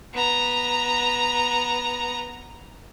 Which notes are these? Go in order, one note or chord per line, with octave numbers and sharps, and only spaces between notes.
B3 A#5